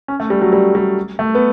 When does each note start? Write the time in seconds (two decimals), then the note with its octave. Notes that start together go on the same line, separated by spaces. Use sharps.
0.08 C#4
0.20 A3
0.30 G3
0.42 F#3
0.53 G3
0.75 G3
1.19 A3
1.35 B3